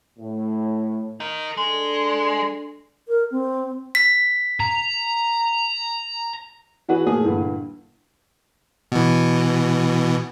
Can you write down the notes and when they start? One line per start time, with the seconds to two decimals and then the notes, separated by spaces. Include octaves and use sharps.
0.19 A2
1.20 D#4 A#4
1.57 G#3 D4 A4
3.08 A#4
3.31 C4
3.95 B6
4.60 A#5
6.89 E3 F#4 G#4 B4
7.06 A#2 F3 A3 A#3 G#4 D#6
7.25 G2 A#2 D3 E3
8.92 B2 E3